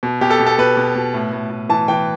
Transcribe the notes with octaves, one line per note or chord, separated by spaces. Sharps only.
B2
B2 G4
A4
B2
A4
B2 B4
B2
B2
A2
A2
A2
E3 A5
E3 G5